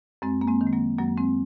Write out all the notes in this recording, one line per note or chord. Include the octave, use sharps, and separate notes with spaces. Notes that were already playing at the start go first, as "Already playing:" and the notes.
F#2 G#3 C4
A#3
G#3 C4
D#3
G#3
F#3 A#3
F#2 F#3 A#3
G#3 C4